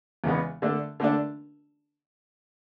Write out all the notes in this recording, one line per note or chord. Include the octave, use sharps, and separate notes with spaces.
E2 C#3 G#3 B3
D3 A3 D4
D3 A3 D4